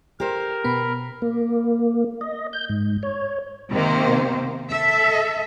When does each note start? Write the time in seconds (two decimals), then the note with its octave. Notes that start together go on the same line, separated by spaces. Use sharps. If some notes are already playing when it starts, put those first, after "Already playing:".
0.20 G4 A#4 C5
0.64 B2 B3 B5
1.22 A#3
2.21 D#5
2.53 G6
2.69 G#2
3.03 C#5
3.71 C3 D#3 A#3 C5
4.71 A4 E5